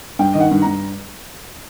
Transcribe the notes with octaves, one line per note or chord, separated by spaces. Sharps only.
G2 G5
D#3 D#5
F#5
G2
G2 A#5